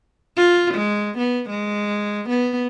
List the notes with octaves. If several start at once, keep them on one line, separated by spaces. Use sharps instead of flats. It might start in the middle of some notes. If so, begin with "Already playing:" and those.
F4
G#3
B3
G#3
B3